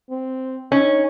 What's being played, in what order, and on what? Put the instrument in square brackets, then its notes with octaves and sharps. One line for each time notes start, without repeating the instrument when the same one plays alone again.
[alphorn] C4
[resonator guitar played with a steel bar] C#4 [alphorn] D#4